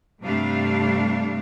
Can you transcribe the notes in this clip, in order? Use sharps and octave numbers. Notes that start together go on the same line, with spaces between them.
G2 C3 G3 A3 D4 F5